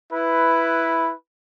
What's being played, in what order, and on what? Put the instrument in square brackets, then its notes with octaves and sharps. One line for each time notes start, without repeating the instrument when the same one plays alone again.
[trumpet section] E4 B4